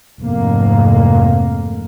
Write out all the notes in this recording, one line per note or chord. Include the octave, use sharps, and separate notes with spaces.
F1 F2 G#2 A#3